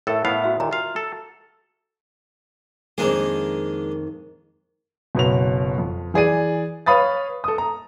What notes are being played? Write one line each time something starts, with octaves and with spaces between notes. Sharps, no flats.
A2 A4 A#4 E5
A2 B3 F5
F#4 E5 A#5
D#2 A#2 A#5
F4 F5
A4
F2 D#3 G#3 A#3 D4 G#4
F#1 B2 F#3 F7
F2
E3 G#4 D5 D#7
B4 C#5 F5 B5 D#6 A6
A4 D#6
A#5